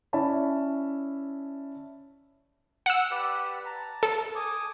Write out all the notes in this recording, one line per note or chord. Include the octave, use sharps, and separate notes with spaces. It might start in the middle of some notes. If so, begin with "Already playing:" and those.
C#4 E4 D5 E5 A5 B5
F#5 E6
G4 B4 D5
A5 A#5
A4
G#5 D6 D#6